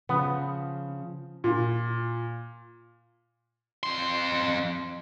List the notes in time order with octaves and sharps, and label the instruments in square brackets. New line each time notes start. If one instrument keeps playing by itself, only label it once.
[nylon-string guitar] C#3 F3 [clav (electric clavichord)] B3
[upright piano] A#2
[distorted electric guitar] F2 C6